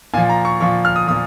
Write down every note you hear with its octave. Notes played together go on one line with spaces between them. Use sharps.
A#2 F3 G#5
A#5
C#6
A#2 F3 C#6
F6
D#6
A#2 F3 D#6